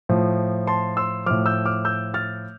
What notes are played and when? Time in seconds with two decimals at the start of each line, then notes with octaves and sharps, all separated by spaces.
0.09 A2 F3
0.67 A5 C6
0.97 C6 E6
1.26 A2 F3 D6 F6
1.46 E6 G6
1.66 D6 F6
1.85 E6 G6
2.14 F6 A6